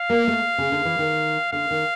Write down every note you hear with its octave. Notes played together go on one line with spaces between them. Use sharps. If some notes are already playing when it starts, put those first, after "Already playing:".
Already playing: F5
A#3
A3
C#3
D3
E3
D#3
D3 F5
D#3